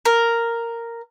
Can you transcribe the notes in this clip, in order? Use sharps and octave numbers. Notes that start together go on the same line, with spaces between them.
A#4